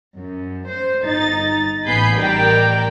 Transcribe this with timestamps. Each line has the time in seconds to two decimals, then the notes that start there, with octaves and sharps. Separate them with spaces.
0.17 F#2
0.70 C5
1.04 G1 D#4 A6
1.84 A1 B3 G#5 B5 G6 C7
2.19 A1 D#3 G3 A#4 D5 G5